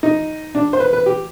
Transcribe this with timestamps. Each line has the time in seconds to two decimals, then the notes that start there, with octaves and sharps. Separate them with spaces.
0.03 D#4
0.55 D4
0.73 C5
0.80 B4
0.93 B4
1.06 G4